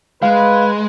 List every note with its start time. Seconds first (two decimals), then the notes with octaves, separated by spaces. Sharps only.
0.23 G#3 B4 F5